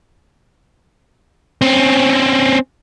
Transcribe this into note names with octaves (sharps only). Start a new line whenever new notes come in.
C4 C#4